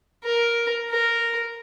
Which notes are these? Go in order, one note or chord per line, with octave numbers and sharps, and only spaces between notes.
A#4
A#4